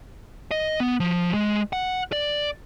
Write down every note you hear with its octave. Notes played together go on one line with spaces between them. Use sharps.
D#5
B3
F3
G#3
F#5
D5